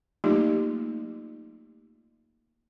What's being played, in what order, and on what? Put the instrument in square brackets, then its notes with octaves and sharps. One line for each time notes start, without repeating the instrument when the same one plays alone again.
[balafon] F#3 A3 A#3 D#4 F4 G4